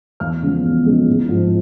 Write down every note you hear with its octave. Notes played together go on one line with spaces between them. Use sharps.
E2 F5 F6
C#3 F3 G#3 B3
E2
C#3 F3 G#3 B3
A1
G#2 F3